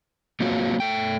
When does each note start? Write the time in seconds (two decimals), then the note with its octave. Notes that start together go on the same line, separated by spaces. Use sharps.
0.40 F#3 A#3 C4 F4 F#4 C#5
0.80 A3 G5